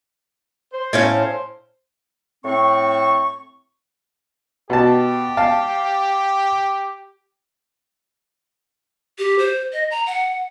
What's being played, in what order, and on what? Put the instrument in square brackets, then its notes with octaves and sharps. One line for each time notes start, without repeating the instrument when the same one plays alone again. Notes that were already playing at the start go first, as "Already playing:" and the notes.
[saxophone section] C5
[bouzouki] A2 C#4 F5
[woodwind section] A2 C4 C#6
[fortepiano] B2 A5 [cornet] G4
[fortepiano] F5 A5
[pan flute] G4
C5
D#5
A#5
F#5